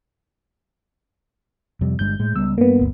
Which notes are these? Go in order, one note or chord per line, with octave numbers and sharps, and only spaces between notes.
F2 C3 G3
G1 G2 G#3 G6
A2 G#3
C#2 G3 B3 E6
G2 A#3 B3
G1 D2